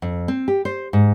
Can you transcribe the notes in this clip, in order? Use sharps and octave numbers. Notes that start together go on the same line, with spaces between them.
F2
C4
G4
C5
G#2